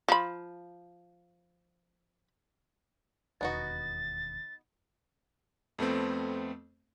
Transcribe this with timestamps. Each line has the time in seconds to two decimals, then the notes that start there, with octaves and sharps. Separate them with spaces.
0.08 F3 B5
3.41 E1 D#2 B3 D#4 F#4 A6
5.79 F2 A3 B3 C4